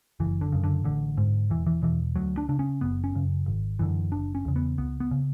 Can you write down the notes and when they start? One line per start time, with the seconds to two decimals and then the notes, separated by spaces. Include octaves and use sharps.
0.20 F#1 E3
0.41 D3
0.52 F#2 C#3
0.64 D3
0.84 A1 D3
1.17 G#2
1.50 E1 E3
1.67 E3
1.83 E2 B2 E3
2.16 D2 F#3
2.38 D4
2.49 C#3 D4
2.59 C#4
2.81 F#1 B3
3.04 C#4
3.15 F#2 C#3
3.46 G#1
3.79 F#2 D3 E3
4.12 F#1 D4
4.35 C#4
4.45 E2 C#3
4.56 B3
4.78 C#2 B3
5.00 B3
5.11 C#3